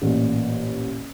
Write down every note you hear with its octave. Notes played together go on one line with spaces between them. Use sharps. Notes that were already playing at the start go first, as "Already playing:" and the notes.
A1 A#2